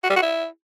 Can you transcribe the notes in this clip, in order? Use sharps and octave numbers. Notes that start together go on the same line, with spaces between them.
F#4
G3
F#4
E4